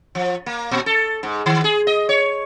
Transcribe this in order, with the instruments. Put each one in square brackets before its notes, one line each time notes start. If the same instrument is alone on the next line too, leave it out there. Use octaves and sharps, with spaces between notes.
[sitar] F3
A#3
A#2
A4
G#2
D#3
G#4
D#5
C#5